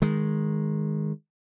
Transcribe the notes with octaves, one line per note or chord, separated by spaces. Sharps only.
D#3 G#3